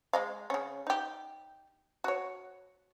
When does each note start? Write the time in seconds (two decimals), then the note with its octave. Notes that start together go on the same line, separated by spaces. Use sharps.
0.13 G#3 D#5 F5
0.50 C#3 C#4
0.87 D#4 G4
2.04 F#4 C#5